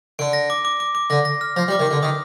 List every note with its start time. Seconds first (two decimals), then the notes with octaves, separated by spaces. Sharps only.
0.19 D3 D7
0.33 A#6
0.50 D6
0.65 D6
0.80 D6
0.95 D6
1.10 D3 A#6
1.25 A#6
1.41 F6
1.56 F3 A#6
1.68 G3
1.72 D6
1.79 D#3
1.87 D3 D6
2.03 D#3 D#6